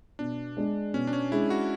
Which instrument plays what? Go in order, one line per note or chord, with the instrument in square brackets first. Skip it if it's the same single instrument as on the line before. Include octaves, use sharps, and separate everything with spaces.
[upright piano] B2 [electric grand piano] D4
[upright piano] G#3 D4 G#4
[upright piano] B2 [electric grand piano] C#4
[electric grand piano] D4
C#4
[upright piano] G#3 D4 G#4 [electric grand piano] E4
[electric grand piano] F#4